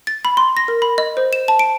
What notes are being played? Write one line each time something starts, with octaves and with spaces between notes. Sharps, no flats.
A6
B5
C6
A#6
A#4
B5
D#5
C5
E7
A5
D7